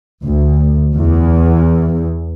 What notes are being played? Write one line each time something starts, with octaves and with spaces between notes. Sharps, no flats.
D2
E2